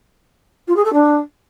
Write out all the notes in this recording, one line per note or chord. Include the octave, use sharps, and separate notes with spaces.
F4
G#4
A4
D4